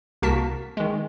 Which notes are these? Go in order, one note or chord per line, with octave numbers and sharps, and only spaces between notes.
C2 A#3 F#4 A#4 A5 B6
D#3 G#3